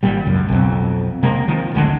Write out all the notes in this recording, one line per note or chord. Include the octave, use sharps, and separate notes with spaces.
G#1 A#2 G3
C#2 F#2
B1 F2
C3 G#3 A#3
D#3 F3
D1 A1 D3 G#3